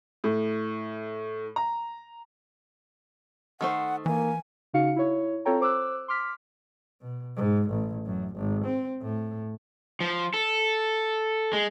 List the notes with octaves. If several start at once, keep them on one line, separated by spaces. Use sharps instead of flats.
A2
A#5
D#3 A3 C5 F#5
E3 A#3 G#5
C#3 D#4 F#4 F5 C#7
E4 C#5
C4 F4 A4 C#5 G5 A#5
C5 D6 E6 F#6
C6 D6 F6 B6
B2
G#2
A1
F#2
G#1
C4
A2
F3
A4
G#3